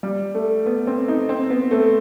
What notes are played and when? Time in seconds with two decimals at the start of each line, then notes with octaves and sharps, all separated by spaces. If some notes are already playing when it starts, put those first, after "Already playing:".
0.03 G3
0.35 A3
0.66 B3
0.87 C4
1.08 D#4
1.29 C4
1.50 B3
1.71 A3